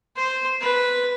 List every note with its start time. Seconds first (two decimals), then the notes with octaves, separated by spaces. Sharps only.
0.16 C5
0.61 B4